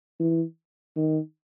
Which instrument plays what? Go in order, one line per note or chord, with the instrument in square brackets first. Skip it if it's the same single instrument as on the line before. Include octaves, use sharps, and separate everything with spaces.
[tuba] E3
D#3